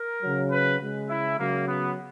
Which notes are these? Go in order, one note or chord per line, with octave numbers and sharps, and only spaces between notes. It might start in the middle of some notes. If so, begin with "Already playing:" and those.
Already playing: A#4
C#3 F#3
B4
C#3 G#3
E4
C#3 F#3 A#3
B3